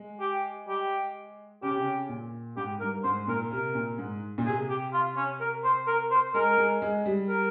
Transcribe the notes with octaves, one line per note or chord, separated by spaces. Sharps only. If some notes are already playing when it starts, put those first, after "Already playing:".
Already playing: G#3
G4
G4
C#3 G4
C3
C#3
A#2
G#2 G4
G2 A#4
G#2 C5
A#2 A#4
C3 A#4
A#2
G#2
A#2
C3 G#4
G4
F4
C#4
A#4
C5
A#4
C5
G#3 A#4
G#3
G#3
G3
A#4